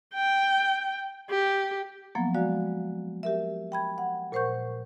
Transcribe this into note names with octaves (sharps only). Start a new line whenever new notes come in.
G5
G4
F3 F#3 A#3 B3
G#3 F#4 D5 F5
G4 A#4 E5
G5 B5 G#6
F#5
A#2 A#4 C5 F#5 C#6 G6